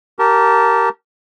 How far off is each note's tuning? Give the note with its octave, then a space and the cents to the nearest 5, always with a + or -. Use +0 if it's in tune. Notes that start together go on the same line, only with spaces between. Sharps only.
G4 -25 A#4 -5 A5 +0